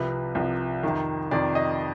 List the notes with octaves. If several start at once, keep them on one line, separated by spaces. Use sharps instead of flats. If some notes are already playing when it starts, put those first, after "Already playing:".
Already playing: C2 C3 F3 B4
C2 C3 F3
F2 C3 D#3
F2 C3 D#3 D5
D#5